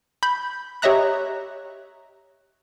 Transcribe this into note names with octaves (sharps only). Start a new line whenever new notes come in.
B5 G6
G4 C#5 D#5 E5 A#5 F#6